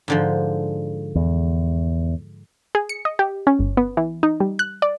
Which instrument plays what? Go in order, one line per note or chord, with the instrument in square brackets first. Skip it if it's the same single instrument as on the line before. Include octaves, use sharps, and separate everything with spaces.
[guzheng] G#2 D3 F3
[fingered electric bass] E2
[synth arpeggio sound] G#4
C#7
D#5
G4
C#4
G1
B3
E3
D#4
G3
F#6
D5